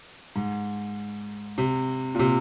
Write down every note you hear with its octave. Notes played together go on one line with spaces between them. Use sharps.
G#2
C3
A#2
C3